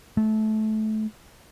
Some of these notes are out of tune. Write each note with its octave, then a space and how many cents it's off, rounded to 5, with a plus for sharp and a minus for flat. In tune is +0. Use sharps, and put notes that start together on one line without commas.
A3 -20